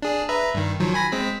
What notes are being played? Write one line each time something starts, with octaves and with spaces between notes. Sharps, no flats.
D4 G#4
B4 E5 A#5
G2 D#3
D#3 F3 F#3
G#5 B5 A#6
G#3 C4 B6